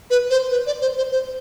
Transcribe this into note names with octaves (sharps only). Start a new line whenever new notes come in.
B4
C5
B4
D5
C5
C5
C5